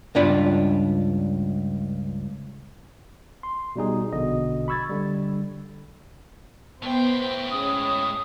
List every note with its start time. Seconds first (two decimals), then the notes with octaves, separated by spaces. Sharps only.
0.15 C#2 G2 D4 F4 B5
3.43 C6
3.76 B2 G3 D#4 G#4
4.13 A#1 B2 D3 D#5
4.68 B5 C#6 E6 G#6 A6
4.89 D3 G3
6.82 A2 B3 C5 G5
7.51 G#3 C#4 D#6